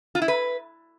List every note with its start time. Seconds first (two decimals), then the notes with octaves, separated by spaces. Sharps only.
0.15 F4
0.22 E4
0.28 B4